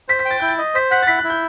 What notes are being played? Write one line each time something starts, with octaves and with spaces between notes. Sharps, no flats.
C5 B6
B6
G5
A6
E4 G6
A6
D#5
C5 B6
F#5 B6
A6
E4 B6
F#6
E4
G6